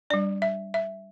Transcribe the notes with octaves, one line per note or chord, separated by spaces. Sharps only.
G3 D4 D5
E5
E5